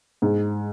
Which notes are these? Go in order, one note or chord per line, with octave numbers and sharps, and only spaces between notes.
G#2